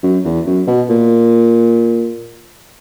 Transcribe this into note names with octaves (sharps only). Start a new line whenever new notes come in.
F#2
E2
F#2
B2
A#2